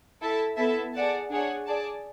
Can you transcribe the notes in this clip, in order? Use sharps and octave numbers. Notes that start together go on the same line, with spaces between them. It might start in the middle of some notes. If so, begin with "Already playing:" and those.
E4 A4 E5 A5
B3 E4 A4 E5 A5
G#4 D5 F#5 A5
D4 G#4 C#5 F#5
G#4 D5 A5